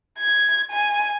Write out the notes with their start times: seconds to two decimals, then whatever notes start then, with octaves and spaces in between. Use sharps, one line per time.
0.19 G#6
0.70 G#5